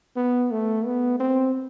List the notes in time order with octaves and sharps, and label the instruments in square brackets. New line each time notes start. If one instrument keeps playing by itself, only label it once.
[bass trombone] B3
A3
B3
C4